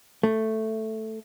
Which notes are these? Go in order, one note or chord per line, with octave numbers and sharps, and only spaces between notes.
A3